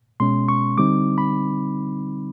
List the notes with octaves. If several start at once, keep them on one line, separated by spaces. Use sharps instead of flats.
B2 G#3 C#4 C6
C#6
D3 G3 C4 D#4 D6
B5